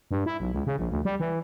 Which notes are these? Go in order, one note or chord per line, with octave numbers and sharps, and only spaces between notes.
G2
E4
B1
C#2
C#3
A#1
D2
G3
E3